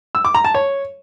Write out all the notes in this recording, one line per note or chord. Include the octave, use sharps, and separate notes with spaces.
E6
D6
A#5
A5
C#5